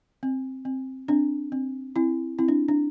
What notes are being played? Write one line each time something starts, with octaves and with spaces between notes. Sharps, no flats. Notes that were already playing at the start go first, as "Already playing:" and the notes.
C4
C4
C4 D4
C4
C4 E4
C4 E4
D4
D4